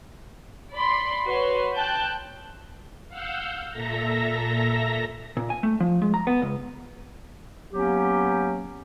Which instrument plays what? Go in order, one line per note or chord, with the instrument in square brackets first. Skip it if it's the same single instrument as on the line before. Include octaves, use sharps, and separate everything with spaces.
[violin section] D5 B5 C6
F#4 B4 C#5 C6
G5 A5 F#6 G6
[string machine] F5 F#5 E6 G6
A#2 A4 E5 A#5 A#6
[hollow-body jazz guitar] A#2
G#5
A3
F3
G#3
A#5
B3
C#2
[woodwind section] F#3 A#3 B3 C#4 G4